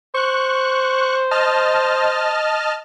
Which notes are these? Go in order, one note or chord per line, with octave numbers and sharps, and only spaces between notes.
C5 C#6 F#6
D#5 A5 F6